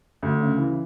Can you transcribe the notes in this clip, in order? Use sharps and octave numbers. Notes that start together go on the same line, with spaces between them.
D2
C#3
E3